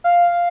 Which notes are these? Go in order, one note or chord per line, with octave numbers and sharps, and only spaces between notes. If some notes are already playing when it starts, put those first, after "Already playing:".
F5